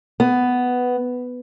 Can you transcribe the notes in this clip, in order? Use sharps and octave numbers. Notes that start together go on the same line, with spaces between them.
B3